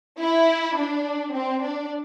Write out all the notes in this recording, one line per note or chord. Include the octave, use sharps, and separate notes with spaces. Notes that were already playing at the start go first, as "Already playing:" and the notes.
E4
D4
C4
D4